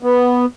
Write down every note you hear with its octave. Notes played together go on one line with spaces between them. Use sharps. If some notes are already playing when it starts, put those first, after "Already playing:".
B3